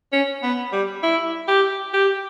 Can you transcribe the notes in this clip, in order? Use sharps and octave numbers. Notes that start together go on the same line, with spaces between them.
C#4
B3
G3
E4
G4
G4